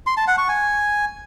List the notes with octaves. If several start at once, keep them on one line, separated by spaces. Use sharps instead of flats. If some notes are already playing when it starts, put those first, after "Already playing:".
C6
A5
F#5
C#6
G#5